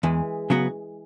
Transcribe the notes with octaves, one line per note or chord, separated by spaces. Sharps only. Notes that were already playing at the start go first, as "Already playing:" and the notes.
E2 E3 G#3
C#3 F#3 B3 F#4